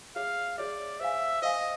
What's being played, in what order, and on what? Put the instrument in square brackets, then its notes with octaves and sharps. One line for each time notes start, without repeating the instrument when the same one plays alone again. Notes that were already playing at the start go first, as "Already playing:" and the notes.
[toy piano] G#4 C#5 E5 [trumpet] F5
[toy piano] G#4 C#5 E5 [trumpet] D5
[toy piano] C5 F5 G#5 [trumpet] E5
[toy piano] C5 F5 G#5 [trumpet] D#5